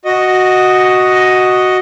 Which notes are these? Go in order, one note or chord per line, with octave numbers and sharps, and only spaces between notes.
F#4 D#5